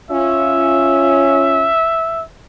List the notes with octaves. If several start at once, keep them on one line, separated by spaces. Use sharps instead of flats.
C#4 F4 E5